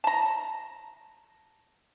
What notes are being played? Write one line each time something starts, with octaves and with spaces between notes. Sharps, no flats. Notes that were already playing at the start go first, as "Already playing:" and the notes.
A5 A#5